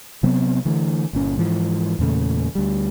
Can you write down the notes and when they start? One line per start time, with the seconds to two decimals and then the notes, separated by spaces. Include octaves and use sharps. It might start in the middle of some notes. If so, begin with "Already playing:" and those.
0.23 C3 F#3 B3 C4
0.65 D3 E3 A3
1.13 G1 A#2 C#4
1.38 G#2 E3 F3
1.99 E2 A#2 C#3 A3
2.55 D2 G3